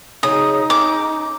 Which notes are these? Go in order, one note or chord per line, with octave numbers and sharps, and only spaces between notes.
C#3 F#3 D#4 G#4 D#6
C#4 A4 G5 D6